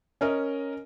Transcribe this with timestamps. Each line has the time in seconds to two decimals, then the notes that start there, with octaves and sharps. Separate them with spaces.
0.21 C#4 A#4 D#5